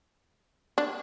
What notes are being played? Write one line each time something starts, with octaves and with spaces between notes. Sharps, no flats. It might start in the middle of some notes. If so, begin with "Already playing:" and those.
D4